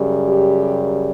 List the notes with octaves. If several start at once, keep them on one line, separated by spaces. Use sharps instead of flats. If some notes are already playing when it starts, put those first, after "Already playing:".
Already playing: F#2 C#3 G3
G4